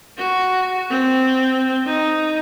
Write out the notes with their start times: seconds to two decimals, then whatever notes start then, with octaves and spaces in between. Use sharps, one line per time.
0.18 F#4
0.90 C4
1.86 D#4